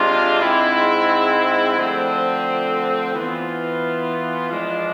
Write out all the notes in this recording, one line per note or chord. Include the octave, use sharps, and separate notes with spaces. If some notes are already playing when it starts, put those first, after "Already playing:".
Already playing: C3 G#3 D4 F4
G#2 G#3 C4 E4
D3 F3 A3 C4
E3 B3 F4
F3 G#3 D4